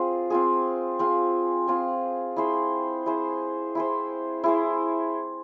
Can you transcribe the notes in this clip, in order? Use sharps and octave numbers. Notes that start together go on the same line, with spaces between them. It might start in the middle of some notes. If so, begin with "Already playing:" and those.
Already playing: C4 F4 G#4
C4 F4 G#4
C4 F4 G#4
C4 F4 G#4
E4 G#4 C5
E4 G#4 C5
E4 G#4 C5
E4 G#4 C5